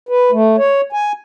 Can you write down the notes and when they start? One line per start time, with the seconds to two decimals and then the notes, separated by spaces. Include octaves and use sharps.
0.09 B4
0.32 A3
0.58 C#5
0.93 G#5